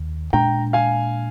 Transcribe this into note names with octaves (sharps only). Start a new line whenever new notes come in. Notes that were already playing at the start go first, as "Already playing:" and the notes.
Already playing: D#2
A#2 G#3 D4 G5 A#5
F5 G#5